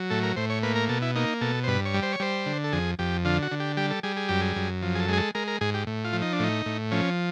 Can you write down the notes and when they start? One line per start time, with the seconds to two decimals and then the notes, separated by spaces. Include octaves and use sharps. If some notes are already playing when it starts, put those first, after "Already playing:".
Already playing: F#3
0.10 A2 A4
0.23 A#4
0.36 A2 C5
0.50 C#5
0.63 A#3 B4
0.76 A#4
0.89 B2 A4
1.02 E4
1.15 A#3 D#4
1.41 B2 A4
1.64 C5
1.67 G2 B4
1.85 C#5
1.94 G3
2.03 C5
2.13 C#5
2.20 G3 C5
2.46 D3
2.64 A4
2.73 F2 G#4
2.99 F2 G4
3.25 D3 F4
3.42 F#4
3.52 D3
3.60 G4
3.77 G3 G4
3.90 A4
4.03 G3 G#4
4.17 G#4
4.29 F#2 G4
4.41 G#4
4.56 F#2
4.82 F3
4.95 G#4
5.00 A4
5.08 G#3 G#4
5.17 A4
5.35 G#3 A#4
5.48 A#4
5.61 G#2 G#4
5.74 G4
5.87 A2
6.04 F4
6.13 F3
6.22 D#4
6.33 D4
6.40 A2 D#4
6.66 A2
6.92 F3 C#4